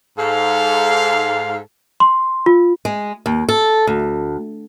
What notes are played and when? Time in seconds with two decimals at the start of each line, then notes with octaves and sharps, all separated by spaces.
0.18 G#2 A4 F5
2.00 C6
2.46 F4
2.85 G#3
3.26 D#2
3.49 A4
3.87 D2